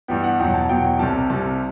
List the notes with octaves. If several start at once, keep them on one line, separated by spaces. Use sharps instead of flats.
G2 E3 G3 B3 G5
F#5
E2 B2 F#3 G5
A5
E2 B2 F#3 G5
G5
C2 C3 G3 A5
C2 C3 G3 A5